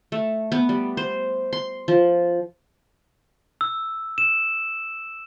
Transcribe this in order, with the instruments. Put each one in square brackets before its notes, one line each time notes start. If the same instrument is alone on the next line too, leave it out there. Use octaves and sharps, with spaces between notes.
[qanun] A3
B3
G3
C5
C6
F3
[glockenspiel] E6
E7